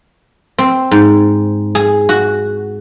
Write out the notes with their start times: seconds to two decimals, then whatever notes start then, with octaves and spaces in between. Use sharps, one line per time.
0.59 C4
0.91 G#2
1.75 G#4
2.09 F#4